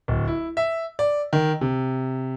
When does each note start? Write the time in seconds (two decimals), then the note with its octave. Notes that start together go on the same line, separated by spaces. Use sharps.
0.08 D1
0.28 E4
0.57 E5
0.99 D5
1.33 D#3
1.61 C3